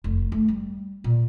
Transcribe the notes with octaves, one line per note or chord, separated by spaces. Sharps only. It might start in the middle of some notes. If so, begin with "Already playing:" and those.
F1
A3
G3
A#2